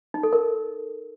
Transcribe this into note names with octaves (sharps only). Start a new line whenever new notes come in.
D#4
A4
A#4